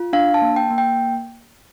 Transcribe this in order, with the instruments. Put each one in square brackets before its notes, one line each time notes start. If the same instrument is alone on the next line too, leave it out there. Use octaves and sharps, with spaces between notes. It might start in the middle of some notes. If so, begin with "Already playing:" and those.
Already playing: [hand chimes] F4
D4 F5
A5
A#3
G5
A#3
G5